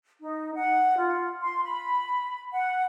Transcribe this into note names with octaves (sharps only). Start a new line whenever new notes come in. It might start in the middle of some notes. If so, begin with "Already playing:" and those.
D#4
F#5
F4
C6
B5
F#5